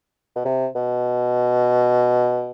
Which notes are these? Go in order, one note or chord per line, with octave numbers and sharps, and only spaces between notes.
B2
C3
B2